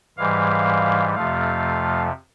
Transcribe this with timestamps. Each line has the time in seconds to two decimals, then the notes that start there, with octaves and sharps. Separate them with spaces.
0.18 G#2 E3 G3 F5
1.14 F2 C3 F3 A3 F5